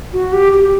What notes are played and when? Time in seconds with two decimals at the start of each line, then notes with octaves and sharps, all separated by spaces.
0.13 F#4
0.33 G4
0.53 G4